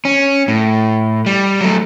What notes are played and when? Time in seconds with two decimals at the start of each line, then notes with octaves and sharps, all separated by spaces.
0.05 C#4
0.48 A2
1.26 G3
1.61 F#3 A3